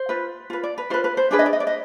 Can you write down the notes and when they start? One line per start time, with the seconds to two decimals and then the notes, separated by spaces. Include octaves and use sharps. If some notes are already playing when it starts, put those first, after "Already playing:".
Already playing: C5
0.09 F4 B4
0.50 F4 B4
0.63 D5
0.78 B4
0.90 F4 B4 C5
1.04 B4
1.17 C5
1.31 D4 G#4 B4 D5
1.39 D#5
1.46 D5
1.53 D#5
1.60 D5
1.67 D#5